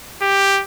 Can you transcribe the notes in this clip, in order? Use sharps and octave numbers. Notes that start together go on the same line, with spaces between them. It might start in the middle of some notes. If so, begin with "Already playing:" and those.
G4